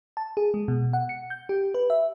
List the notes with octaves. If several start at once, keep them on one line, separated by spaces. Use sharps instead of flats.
A5
G#4
G#3
B2
F#5
C#7
G6
G4
B4
E5